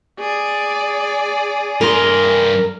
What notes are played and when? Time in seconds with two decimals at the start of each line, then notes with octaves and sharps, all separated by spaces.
0.20 G#4 D5
1.81 G2 A#4 C6